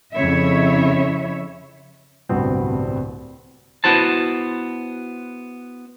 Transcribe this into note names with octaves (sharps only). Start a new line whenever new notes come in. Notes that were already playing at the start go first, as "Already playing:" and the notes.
F2 C#3 E4 C#5 E5
D1 C2 G2 B3 C4 F#4
B3 E4 F#4 C5 A5